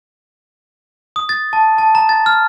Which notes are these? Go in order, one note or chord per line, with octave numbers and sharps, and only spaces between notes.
D#6
A6
A5
A5
A#5
A6
F6